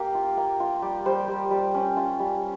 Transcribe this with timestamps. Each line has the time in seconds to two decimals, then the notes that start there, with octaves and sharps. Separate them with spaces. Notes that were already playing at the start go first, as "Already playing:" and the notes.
Already playing: A#3 G4 F5 G5
0.15 F4
0.37 A#3
0.60 F4
0.82 G3 G4
1.06 G3 C5
1.28 G3
1.51 G3
1.74 C#4
1.97 F4
2.19 G3